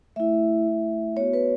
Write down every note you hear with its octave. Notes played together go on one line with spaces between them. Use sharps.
A3 E4 E5
A3 E4
B3 F#4 C#5
B4